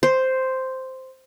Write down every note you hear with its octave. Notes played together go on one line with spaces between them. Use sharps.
C5